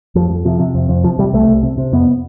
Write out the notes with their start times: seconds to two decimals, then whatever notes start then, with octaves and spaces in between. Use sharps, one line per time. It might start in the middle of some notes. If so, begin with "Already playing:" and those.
0.15 F2 F3
0.30 F2
0.45 C3 F3
0.60 C3
0.75 F2
0.89 F2
1.04 C3 F3
1.19 C3 G3
1.33 C2 A3
1.48 C2
1.63 C3
1.78 C3
1.92 F2 B3